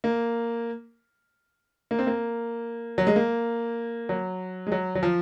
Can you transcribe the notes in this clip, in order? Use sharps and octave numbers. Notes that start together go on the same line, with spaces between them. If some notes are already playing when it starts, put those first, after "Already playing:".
A#3
A#3
C4
A#3
F#3
G#3
A#3
F#3
G#3
F#3
F#3
F3